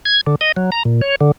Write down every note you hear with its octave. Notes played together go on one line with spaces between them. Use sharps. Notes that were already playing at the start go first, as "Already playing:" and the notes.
G#6
D3
D#5
F#3
A#5
A#2
C#5
D3